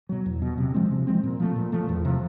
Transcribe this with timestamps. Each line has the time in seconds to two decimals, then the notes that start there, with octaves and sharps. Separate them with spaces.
0.09 B2 F#3
0.26 E2
0.42 B2 F#3
0.58 C3
0.74 F3 G#3 C4
0.91 C3
1.07 F3 G#3 C4
1.23 A#2
1.40 F3 A3
1.56 A#2
1.72 F3 A3
1.89 E2
2.05 C3 F3